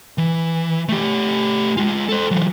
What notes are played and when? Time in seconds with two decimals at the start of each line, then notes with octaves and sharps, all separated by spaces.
0.18 E3
0.89 A3 G4
1.77 G#3 F4
2.09 A4 C5
2.31 E3 F#3